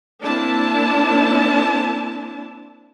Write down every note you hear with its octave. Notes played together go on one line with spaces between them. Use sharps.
A#3 C4 D4 E4 A5